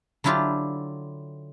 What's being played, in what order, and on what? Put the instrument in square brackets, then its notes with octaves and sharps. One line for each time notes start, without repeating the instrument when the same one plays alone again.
[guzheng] D3 F#3 E4 F4 G4